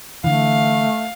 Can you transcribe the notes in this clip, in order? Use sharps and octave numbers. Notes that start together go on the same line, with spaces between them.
D3 E3 A3 F5